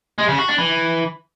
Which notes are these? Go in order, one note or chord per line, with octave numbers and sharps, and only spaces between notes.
G#3
C#3
F#4
D4
E3